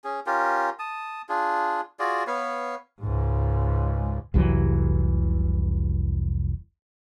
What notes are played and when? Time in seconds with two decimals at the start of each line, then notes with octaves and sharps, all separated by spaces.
0.04 C#4 G#4
0.27 C#4 F4 G4 A#4
0.79 A5 D#6
1.29 D4 F4 G#4
1.99 F4 F#4 G#4 D5
2.27 B3 B4 C#5 F5
3.01 C#2 G#2
4.34 F1 C2 E3 F#3